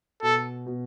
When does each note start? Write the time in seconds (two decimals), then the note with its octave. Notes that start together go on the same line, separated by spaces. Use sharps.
0.23 B2 A4
0.66 B2